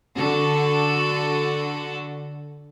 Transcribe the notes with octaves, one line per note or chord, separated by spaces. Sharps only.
D3 F#4 A4